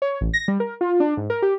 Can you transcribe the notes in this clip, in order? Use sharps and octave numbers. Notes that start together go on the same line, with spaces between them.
C#5
A1
A#6
G3
A#4
F4
D4
G#2
A#4
G4